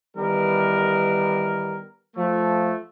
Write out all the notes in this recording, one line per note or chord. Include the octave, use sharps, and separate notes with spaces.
D#3 E3 G3 B3 A#4
F3 A3